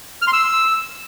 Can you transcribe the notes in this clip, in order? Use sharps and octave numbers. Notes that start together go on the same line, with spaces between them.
F6
C6
E6